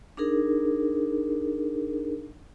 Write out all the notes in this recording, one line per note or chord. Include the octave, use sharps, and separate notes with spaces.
D4 D#4 G#4 A#4